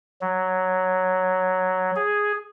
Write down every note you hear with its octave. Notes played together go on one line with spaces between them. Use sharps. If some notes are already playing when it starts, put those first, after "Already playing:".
F#3
G#4